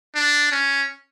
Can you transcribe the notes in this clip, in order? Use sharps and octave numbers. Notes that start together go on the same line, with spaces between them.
D4
C#4